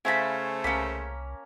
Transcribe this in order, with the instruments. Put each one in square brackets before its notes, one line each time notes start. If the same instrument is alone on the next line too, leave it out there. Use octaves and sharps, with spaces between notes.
[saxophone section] C#3 A3 C5 [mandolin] E4 F5 B5 [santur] G#5 A5
[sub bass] C2 [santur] A#3 A#5 [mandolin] C#4 B5